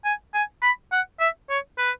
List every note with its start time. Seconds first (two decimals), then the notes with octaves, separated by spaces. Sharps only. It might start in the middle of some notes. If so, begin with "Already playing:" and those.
0.05 G#5
0.34 G#5
0.62 B5
0.92 F#5
1.20 E5
1.50 C#5
1.78 B4